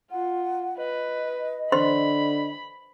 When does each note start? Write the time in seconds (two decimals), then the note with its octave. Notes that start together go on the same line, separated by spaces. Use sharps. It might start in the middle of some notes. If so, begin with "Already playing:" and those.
0.11 F4 F#5
0.78 B4 D#5
1.72 D3 C5 B5 C6